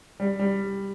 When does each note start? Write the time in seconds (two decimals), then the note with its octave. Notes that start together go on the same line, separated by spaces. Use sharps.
0.20 G3
0.39 G3